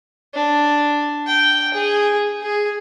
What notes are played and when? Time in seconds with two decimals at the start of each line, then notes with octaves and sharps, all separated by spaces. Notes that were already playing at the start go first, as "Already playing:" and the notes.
0.34 D4
1.27 G5
1.74 G#4
2.43 G#4